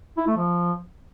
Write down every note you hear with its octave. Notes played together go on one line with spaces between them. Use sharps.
E4
A3
F3